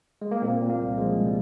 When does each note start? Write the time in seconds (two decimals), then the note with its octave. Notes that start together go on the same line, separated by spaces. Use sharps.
0.22 G#3
0.31 A#3
0.42 A#2 C4
0.61 A#2
0.70 A#3
0.79 C2
0.98 F3 G#3
1.16 C2
1.26 G3